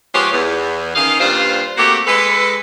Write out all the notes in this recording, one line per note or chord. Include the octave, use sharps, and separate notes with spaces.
F3 G#3 B3 G4 C5 C#5
E2
D#3 C#4 D#5 F5
G2 A#2 G3 F4 C5
A3 A#3 C4 F#4 G4
G#3 A4 B4